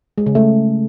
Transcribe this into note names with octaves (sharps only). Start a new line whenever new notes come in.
G#3
C#3
A3